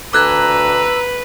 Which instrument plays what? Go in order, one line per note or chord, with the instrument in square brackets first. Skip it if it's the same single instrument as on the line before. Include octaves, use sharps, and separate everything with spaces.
[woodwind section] D2 A#5 [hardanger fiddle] B4 [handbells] D6 F#6 G#6 [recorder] E6